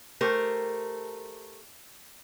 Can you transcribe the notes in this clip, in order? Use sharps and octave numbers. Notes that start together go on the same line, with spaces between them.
A3 G4 A#4 C5